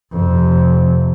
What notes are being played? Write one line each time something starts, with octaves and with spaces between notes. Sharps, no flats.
F2 C3